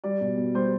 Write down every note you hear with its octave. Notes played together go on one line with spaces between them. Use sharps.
G3 D5
B2
B2
G3 C5